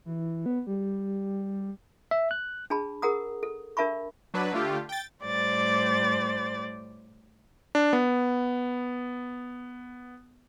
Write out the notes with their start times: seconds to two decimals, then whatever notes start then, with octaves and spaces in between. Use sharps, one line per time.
0.06 E3
0.46 B3
0.67 G3
2.11 E5
2.31 F#6
2.70 D4 G#4 A5 B5
3.02 G#4 A#4 F#5 A#5 D#6
3.43 A4
3.77 D4 A#4 E5 A5 B5 C#6
4.34 F#3 D4 B4
4.53 D3 A3 F4 G4
4.89 G5 A6
5.24 A2 G3 C5 D5 A6
7.75 D4
7.93 B3